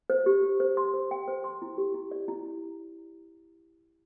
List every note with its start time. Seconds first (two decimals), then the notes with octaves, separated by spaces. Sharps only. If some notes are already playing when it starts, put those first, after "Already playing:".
0.10 C5
0.26 G4
0.43 G4
0.60 C5
0.77 C6
0.94 C5
1.11 G5
1.28 C5
1.44 C6
1.62 E4
1.78 G4
1.94 E4
2.11 D5
2.28 E4